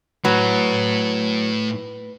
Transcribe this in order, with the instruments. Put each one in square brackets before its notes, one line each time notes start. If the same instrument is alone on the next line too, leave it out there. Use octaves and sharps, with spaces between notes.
[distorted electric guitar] A2 [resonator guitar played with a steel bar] F#3 [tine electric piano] B4